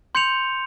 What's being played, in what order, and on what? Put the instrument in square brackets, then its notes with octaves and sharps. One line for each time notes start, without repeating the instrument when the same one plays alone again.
[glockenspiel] C6 G6 C#7 F7